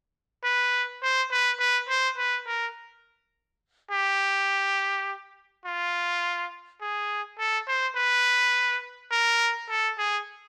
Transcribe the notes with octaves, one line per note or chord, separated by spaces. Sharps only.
B4
C5
B4
B4
C5
B4
A#4
G4
F4
G#4
A4
C5
B4
A#4
A4
G#4